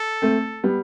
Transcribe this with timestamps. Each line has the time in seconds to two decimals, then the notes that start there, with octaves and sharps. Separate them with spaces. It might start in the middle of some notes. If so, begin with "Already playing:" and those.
Already playing: A4
0.22 A3 C4
0.64 G3 B3